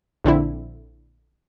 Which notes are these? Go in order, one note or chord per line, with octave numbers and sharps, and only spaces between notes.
A#1 D3 C4 E4